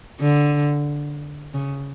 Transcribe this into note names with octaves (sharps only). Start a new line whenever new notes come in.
D3
C#3